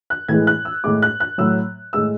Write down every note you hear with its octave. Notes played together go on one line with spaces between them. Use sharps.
F#6
A2 E3 G#3 G#6
F#6
E6
A2 G#3 D6
F#6
F#6
A2 F#3 E6
A2 G#3 E6